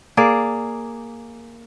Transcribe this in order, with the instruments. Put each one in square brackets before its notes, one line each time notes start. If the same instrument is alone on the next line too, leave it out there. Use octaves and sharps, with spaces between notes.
[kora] A#3 G#4 D5